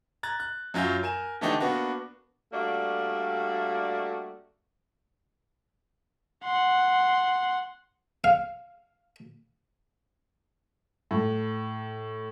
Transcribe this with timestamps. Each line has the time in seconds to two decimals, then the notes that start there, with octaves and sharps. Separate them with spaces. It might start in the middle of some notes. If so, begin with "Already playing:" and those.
0.23 A#5 F#6 G#6 A6
0.40 F#6
0.74 F#2 F#3 F4 E5 G6
1.03 A#4 G#5 E7
1.41 D3 E3 A3 D4 D#4 G4
1.60 A#3 B3 D4 F#4
2.52 G3 A3 A#3 D4 F#4 E5
6.44 F#5 C6
8.24 F5
11.11 A2